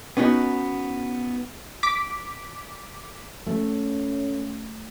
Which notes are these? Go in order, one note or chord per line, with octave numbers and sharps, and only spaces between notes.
B3 C#4 D#4 F#4
D6 B6
A3 C#4